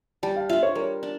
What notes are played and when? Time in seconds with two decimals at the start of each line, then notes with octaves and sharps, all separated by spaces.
0.23 G3 A5
0.36 F5
0.49 D4 F4 E5
0.63 C#5
0.75 G3 A#4
1.03 D4